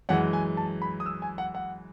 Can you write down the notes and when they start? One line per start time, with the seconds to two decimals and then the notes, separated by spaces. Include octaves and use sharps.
0.09 F#2 E3 G#3 F#5
0.33 G#5
0.57 A5
0.82 B5
1.00 D#6
1.06 E6
1.22 G#5
1.38 F#5
1.55 F#5